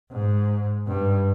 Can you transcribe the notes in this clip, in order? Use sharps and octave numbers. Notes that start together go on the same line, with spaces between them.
G#2
G2